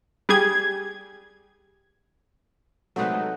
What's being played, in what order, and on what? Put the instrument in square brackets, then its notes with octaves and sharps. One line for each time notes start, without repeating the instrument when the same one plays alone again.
[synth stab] G3 G4 G#4 G#6
[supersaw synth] C3 G#3 A3 [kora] F#3 D#4 B4